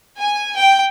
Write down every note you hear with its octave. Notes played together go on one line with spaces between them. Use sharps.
G#5
G5